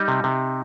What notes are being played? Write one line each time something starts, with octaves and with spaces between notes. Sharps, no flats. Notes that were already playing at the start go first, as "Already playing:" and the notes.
Already playing: G3 D#4
C3
C3